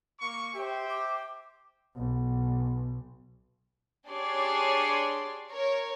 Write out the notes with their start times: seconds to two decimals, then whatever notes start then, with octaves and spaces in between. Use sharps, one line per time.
0.20 A#3 C#6
0.54 G4 C5 E5 G5
0.88 D6
1.96 B1
4.08 D4 G4 G#4 C#5 D5 C6
5.50 A#4 C#5